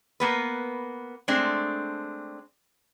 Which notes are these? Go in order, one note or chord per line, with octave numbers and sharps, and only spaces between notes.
A#3 B3 B4
G#3 A3 C4 D4